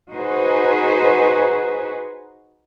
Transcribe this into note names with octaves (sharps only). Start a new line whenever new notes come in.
D#4 F#4 G#4 B4 C5